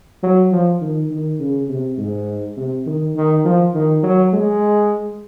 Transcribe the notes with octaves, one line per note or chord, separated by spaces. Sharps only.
F#3
F3
D#3
D#3
C#3
C3
G#2
C3
D#3
D#3
F3
D#3
F#3
G#3